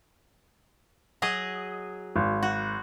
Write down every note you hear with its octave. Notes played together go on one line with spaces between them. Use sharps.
F#3 G#4 D#5
G#1
F#4